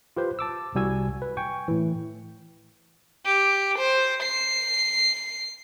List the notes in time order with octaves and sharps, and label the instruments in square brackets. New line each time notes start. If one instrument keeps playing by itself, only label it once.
[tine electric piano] F4 G4 B4 C5
A5 D6 E6
C2 G3 F#4 G#5 E6 G#6
B4
G5 G#5 C#6
A2 E3
[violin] G4
C5
C7